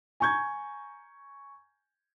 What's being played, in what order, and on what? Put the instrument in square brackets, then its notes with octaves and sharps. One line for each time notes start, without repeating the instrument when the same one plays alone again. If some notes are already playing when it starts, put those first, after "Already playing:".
[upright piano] G#5 A#5 C#6 G6 G#6